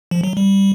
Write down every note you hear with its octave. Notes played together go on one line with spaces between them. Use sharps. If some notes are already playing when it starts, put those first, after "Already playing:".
F3
F#3
G3